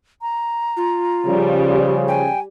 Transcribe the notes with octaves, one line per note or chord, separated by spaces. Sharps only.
A#5
F4
C#3 F3 G3
G5 G#5